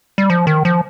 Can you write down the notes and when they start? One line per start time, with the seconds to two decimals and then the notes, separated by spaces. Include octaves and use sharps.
0.18 G3
0.30 F3
0.47 D#3
0.65 F3